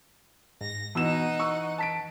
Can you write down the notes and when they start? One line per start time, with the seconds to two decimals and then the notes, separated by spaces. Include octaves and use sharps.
0.61 G#2 A#6
0.95 B2 E3 D#4 F#5 E6 E7
1.40 C#6 E6
1.78 A5 B6 D7